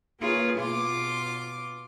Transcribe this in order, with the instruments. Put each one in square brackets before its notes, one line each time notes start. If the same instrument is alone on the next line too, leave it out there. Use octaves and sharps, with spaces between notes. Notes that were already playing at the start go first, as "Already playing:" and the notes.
[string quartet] A#3 F4 G#4 B4 C#5
B2 F4 C6 D6